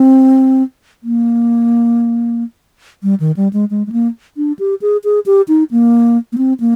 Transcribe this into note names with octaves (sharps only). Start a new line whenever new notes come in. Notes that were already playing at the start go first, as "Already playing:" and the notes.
Already playing: C4
A#3
G3
D#3
G3
G#3
G#3
G#3
A#3
D4
G4
G#4
G#4
G4
D#4
A#3
A#3
C4
A#3